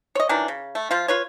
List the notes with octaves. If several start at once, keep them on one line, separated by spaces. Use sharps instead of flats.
C#5 D#5
D#3 E3 F#3 D4
C#3
A3
F3 F4
F4 B4 C#5